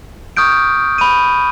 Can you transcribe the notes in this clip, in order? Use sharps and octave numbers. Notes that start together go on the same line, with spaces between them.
C#6 D#6 F6 G6 D7
B5 D#7